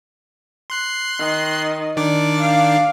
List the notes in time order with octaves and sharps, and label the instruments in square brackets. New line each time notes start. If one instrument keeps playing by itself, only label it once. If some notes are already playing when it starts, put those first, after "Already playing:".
[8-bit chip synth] C6 F#6 C7
[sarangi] D#3
[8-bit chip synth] D#3 D4 D6 [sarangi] D5
[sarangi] F5